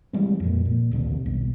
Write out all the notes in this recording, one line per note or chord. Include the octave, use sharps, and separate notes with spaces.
E3 G3 G#3 C4
F2 A#2
A#2
D1 A#1 D#2 C3
D#1 B1